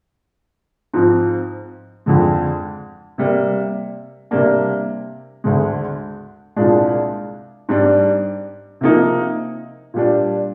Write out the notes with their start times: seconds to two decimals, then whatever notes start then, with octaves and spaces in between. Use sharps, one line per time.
0.93 G#2 F3 C4
2.06 F2 D3 G#3
3.18 C3 G3 A#3
4.31 C3 G3 A#3 D4
5.44 D2 D3 G#3
6.56 C2 A#2 G#3 D4
7.69 G#2 G3 D4
8.81 C3 F3 A#3 D#4
9.94 A#2 G3 D4